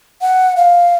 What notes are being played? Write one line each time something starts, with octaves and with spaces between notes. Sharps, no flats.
F#5
F5